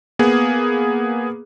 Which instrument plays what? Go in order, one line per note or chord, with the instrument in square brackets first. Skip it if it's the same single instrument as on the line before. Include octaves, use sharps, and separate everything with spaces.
[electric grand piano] A#3 B3 G#4